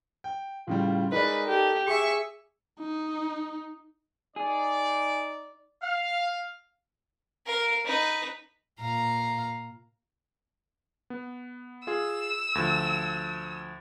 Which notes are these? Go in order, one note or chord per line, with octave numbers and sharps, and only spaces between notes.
G5
A2 C#3 G3 F4
G#3 D#4 A#4 B4 D5
G4 A4
G#4 E5 C#6 D6
D#4
D#4 G#4 D5
F5
A#4 F5
D#4 B4
A#2 F5 A#5
B3
F4 G#4 E6
D2 F3